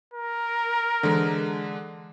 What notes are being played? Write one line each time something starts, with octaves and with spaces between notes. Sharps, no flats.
A#4
D3 E3 G#3 A4